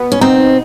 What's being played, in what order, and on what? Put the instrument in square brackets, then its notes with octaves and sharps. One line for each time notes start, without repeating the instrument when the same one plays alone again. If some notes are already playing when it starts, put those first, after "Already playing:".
Already playing: [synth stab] B2 B3
[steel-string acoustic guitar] C#4
[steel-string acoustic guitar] C4 [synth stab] D#4